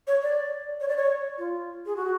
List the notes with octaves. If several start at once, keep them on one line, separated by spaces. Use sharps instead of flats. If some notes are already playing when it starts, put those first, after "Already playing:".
C#5
D5
C#5
D5
C#5
F4
G#4
F#4